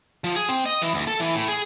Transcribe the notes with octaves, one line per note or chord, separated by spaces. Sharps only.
F3
G#4
C4
D#5
E3
D2
A4
E3
A2
G#4